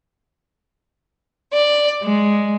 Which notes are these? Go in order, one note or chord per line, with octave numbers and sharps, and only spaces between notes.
D5
G#3